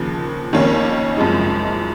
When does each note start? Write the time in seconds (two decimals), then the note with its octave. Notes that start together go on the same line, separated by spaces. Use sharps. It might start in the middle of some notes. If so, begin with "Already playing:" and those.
Already playing: D#2 C#3 F3
0.53 F2 D#3 A#3 C#4
1.17 F#1 F#2 F3 G#3 D#4